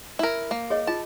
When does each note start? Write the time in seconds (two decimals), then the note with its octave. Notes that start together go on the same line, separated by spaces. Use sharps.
0.19 E4 A#4
0.51 A#3
0.70 G#4 C#5 D#5
0.87 F4 G#4 A5